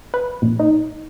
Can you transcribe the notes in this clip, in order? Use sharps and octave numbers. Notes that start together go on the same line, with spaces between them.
B4
A#1
D#4